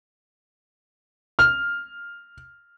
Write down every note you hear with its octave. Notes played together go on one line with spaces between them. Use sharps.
F6